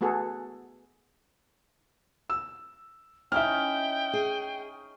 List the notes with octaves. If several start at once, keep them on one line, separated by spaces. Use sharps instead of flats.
A3 B3 F#4 G#4 A4
E6
C#4 D#4 E4 E5 G5 F6
G#4